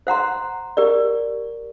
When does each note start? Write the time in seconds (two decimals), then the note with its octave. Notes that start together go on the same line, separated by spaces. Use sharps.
0.07 C5 F#5 A#5 C6
0.77 G4 A#4 D5